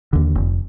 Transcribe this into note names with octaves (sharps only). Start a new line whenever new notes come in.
D#2 D3
F1